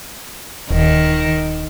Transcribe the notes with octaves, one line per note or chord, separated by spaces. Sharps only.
D#1 D#3